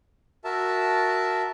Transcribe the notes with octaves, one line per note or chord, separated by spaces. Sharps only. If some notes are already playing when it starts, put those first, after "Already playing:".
F#4 A#4 E5 A5